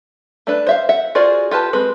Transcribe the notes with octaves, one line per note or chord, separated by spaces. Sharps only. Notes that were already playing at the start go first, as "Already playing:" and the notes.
A3 D4 B4
C5 E5 F5
E5 F#5
F4 F#4 G#4 C5 D5
F4 G4 B4 A5
G#3 C4 B4